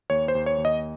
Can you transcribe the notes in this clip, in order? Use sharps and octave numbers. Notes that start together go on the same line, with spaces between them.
D#2 C#5
C5
D#2
C#5
D#2
D#5